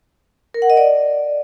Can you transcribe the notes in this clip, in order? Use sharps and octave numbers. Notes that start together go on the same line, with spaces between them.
A#4
F#5
D#5
D5